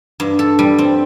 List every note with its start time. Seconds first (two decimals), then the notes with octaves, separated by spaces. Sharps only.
0.20 G2
0.39 A4
0.59 G3
0.79 C4